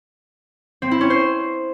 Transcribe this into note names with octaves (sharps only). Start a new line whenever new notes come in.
C4
E4
C#4
C5